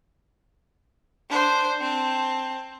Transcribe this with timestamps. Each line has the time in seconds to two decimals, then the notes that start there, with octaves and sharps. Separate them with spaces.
1.29 D4 C5
1.81 C4 A5